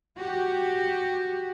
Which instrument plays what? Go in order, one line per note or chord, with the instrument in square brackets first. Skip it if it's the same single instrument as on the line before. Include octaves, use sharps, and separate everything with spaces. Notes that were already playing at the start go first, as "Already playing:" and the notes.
[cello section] F#4 G4